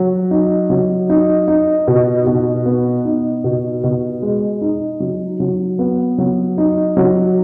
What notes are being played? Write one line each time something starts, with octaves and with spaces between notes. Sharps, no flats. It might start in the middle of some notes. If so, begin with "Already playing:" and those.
Already playing: F#3
D#4
F#3
D#4
D#4
B2
B2
B3
D#4
B2
B2
G#3
D#4
F#3
F#3
B3
F#3
D#4
F#3